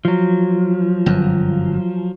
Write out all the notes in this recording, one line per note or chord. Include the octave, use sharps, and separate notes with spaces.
F3 F#3
G1 F#2